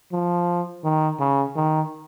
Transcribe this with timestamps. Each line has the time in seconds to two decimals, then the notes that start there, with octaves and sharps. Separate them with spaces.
0.12 F3
0.84 D#3
1.19 C#3
1.56 D#3